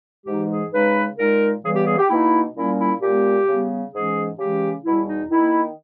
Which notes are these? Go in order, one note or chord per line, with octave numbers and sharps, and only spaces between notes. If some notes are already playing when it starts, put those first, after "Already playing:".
G#2 E3 G#3 D#4 G4
G#4
C#3 G#3 D#4 B4
A#2 G#3 D#4 A#4
C#3 E3 G3 B3 G#4
G4
G#4
G4
B2 A#3 D#4 E4
A#2 G3 A#3 C#4 E4
E4
A#2 G#3 B3 G4
C#3 G3 B3
G#2 E3 G#3 C#4 G#4
C#3 E3 G#3 C#4 G4
E2 B2 G3 E4
D#4
D#3 A#3 D#4 E4